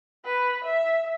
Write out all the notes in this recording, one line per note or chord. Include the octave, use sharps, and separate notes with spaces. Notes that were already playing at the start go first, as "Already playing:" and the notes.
B4
E5